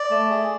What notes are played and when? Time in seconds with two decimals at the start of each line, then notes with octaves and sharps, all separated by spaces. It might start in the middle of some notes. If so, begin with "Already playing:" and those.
Already playing: D5
0.10 A3
0.30 G#4